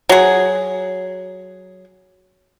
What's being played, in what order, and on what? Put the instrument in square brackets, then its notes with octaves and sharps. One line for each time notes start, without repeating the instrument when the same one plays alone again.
[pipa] F#3 G#4